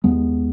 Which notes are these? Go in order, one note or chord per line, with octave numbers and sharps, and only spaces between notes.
D#2 G#3 B3